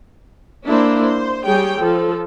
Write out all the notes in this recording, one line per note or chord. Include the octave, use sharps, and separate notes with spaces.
A#3 D4 E4 C5
C5
G3 G#4 C#5 G5
F3 A4